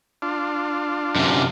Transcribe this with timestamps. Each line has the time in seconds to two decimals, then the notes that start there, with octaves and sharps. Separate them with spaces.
0.22 D4 F4
1.16 F#2 C3